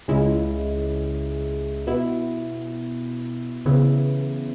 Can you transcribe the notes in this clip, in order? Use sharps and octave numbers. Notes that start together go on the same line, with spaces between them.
C#2 C#3 G#3 E4
B2 B3 E4
C#3 E3 B3 E4